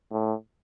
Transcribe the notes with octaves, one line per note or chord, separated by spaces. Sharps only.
A2